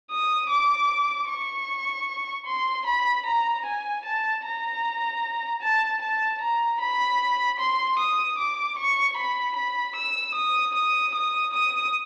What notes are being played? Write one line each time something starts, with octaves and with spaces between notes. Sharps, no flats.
D#6
D6
C#6
C6
B5
A#5
G#5
A5
A#5
A5
A5
A#5
B5
C6
D#6
D6
C#6
B5
B5
E6
D#6
D#6
D#6
D#6